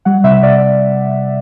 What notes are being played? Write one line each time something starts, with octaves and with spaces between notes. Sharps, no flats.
G3 F#5
C3 E5
C3 D5